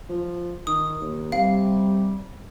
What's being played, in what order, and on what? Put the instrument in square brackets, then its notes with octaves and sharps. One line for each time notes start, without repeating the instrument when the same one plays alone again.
[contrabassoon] F3
[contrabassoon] D#3 [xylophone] D#6
[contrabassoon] D#2
[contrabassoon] C3 [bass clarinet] G3 [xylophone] F5